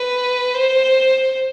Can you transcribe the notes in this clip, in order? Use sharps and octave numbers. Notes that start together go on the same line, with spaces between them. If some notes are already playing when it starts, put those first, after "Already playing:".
Already playing: B4
C5